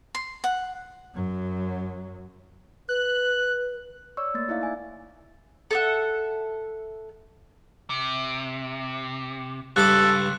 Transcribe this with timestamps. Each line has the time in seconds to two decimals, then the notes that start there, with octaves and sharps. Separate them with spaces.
0.15 C6
0.44 F#5
1.15 F#2 F#3
2.89 B4 F#6
4.17 C#5 D5 C#6 E6
4.34 A3 A#3 A6
4.48 D#4 E4 D5 E5 F5
4.61 D5 G#5
5.71 A4 E5 F#5
7.90 C3
9.76 C#2 G2 A4 B4 D6 F#6